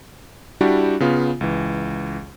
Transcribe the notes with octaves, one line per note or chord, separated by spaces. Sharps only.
G3 D4 E4 F#4 G4
C#3 B3 F4
C#2 E3